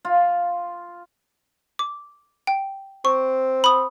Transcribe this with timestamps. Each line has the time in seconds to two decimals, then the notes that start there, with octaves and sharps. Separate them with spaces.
0.05 F4
1.79 D6
2.47 G5
3.05 C4 C#6
3.64 B5 D#6